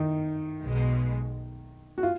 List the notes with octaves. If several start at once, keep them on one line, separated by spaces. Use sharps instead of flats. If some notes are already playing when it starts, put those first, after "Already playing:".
Already playing: D#3 D#4
B1 B2 G#3
F#4
F4